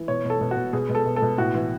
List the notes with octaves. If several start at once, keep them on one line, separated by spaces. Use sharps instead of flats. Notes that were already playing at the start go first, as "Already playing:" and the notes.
Already playing: E3
B2 C#5
B2
A4
B2
F#4
B2
B2 G#4
B2
A4
B2
A4
B2
A2 F#4
E3